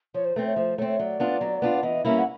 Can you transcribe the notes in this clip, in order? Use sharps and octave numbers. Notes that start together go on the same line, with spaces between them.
F3 C#5
C5
A3 C4 B4
C#5
F3 C5
A3 C4 C#5
C#5
F#3 D5
B3 D4 F4
F#3
B3 D4 F4
E3 D#5
G3 A#3 C#4 E4 E5
F#5